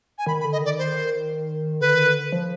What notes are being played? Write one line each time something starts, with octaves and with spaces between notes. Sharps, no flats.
G#5
D#3 B5
B5
D3
D#5
D#3 D5
C5
D3 B4
D#3
D3
F3